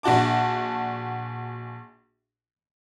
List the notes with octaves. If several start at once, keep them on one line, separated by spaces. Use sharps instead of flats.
A#1 D4 F#4 A5 D6